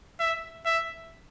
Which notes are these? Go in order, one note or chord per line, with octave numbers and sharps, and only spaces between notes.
E5
E5